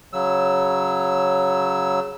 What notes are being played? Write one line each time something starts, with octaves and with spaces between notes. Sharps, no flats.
C#3 F#3 E6